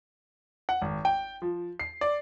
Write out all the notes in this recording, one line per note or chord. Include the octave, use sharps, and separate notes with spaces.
F#5
G#1
G5
F3
C7
D5